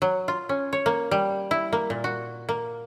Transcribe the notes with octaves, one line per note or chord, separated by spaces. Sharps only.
F#3
F4
C#4
C#5
A#3
G3
E4
A#3
A#2
F#4
A#3